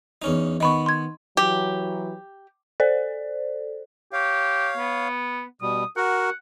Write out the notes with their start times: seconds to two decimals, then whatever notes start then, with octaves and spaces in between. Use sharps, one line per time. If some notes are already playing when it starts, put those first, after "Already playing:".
0.22 E2 C#4 D#4
0.60 D#3 B3 D#5 B5 C#6
0.86 C6 G#6
1.37 E3 F#3 G4
2.80 A4 C5 D5
4.13 G4 C#5 F5
4.77 B3
5.62 B2 G3 D#6
5.97 F#4 A#4 F#5